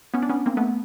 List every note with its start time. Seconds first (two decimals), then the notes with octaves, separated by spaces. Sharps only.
0.14 B3 C#4
0.22 D4
0.29 B3 C#4
0.46 A#3 C4
0.57 A3 B3